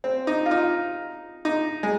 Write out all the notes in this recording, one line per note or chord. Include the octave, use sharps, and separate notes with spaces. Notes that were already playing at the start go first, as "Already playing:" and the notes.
C4
D#4
F4
D#4
D#4
G#3